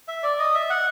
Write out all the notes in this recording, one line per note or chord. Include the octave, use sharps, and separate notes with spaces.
E5
D5
D#5
E5
F#5